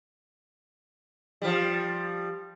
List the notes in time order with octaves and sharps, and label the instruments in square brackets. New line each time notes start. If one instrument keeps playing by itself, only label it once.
[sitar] F3 G3